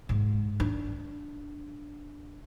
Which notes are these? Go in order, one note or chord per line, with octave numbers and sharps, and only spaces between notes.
G#2
D4